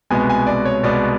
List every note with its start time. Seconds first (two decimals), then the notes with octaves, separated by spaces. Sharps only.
0.10 C2 B2 G#3 B3 G#5
0.30 G#5
0.47 D5
0.65 C#5
0.83 C2 B2 G#3 B3 D5